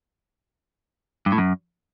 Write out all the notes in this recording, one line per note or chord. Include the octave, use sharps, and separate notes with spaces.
G2
A2
F#2